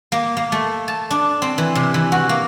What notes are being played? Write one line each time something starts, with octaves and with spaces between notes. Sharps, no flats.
A#3
A#3
A3
A5
D4
C4
E3
C3
E3
F#4
A#3